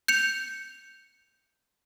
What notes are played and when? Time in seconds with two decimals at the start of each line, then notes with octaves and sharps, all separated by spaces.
0.08 G6 C#7 F7